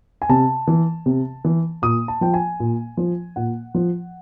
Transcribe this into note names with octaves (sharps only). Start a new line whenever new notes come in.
G#5
C3 A5
E3
C3
E3
A#2 D#6
A5
F3 G5
G#5
A#2
F3
A#2 F#5
F3